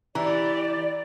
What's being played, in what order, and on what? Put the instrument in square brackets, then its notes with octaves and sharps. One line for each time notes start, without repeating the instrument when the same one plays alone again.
[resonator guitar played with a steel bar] E3 [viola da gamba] E4 G4 [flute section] D5 [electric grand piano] A#5